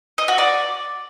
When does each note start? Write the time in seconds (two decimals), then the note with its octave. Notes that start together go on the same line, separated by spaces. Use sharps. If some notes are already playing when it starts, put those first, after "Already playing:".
0.18 D#5
0.28 F#4
0.38 D5